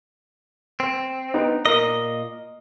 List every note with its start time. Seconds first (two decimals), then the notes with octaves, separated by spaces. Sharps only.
0.80 C4
1.34 B3 D#4
1.66 A#2 A#4 D#5